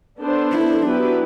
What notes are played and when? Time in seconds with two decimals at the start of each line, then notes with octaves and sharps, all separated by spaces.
0.20 B3 D4 A4 C5
0.51 E4
0.83 F#3 B3 D4 E4 G4 B4